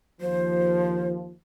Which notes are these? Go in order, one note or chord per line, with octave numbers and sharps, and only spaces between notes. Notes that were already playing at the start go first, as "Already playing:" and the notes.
D#2 F3 C5